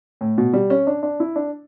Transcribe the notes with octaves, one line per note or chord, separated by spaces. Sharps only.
A2
B2
G3
C#4
D4
D4
E4
D4